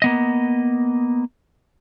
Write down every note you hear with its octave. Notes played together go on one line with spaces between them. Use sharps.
A#3 B3 D#5